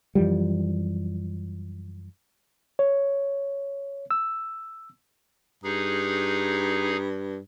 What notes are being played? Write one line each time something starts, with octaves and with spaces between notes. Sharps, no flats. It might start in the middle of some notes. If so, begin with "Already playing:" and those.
F#2 E3 F3 G3
C#5
E6
G2 D#4 G#4